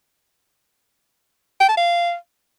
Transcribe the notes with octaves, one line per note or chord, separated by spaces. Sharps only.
G5
A5
F5